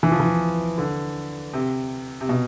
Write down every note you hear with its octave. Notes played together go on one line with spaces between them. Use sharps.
E3
F3
E3
D3
C3
C3
B2